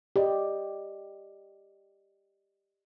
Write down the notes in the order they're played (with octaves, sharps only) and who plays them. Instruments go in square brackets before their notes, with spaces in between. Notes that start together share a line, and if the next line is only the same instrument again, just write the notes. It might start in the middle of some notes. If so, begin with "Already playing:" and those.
[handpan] G4 D5 D#5